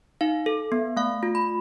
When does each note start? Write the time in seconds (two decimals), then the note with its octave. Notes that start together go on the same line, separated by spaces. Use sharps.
0.21 D#4 F5
0.46 A4
0.72 B3
0.97 A3 F5
1.23 F4
1.35 B5